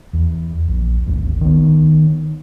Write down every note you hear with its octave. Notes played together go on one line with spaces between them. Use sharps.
E2
A#1
G#1 D2
D#3 B3